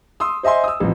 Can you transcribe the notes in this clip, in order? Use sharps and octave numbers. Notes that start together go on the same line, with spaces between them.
C6 D#6 E6
C5 D#5 E5 G#5 C6
D#6 E6
A1 F2